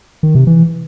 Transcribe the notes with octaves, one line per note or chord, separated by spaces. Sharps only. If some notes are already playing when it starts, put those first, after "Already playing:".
D#3
C3
E3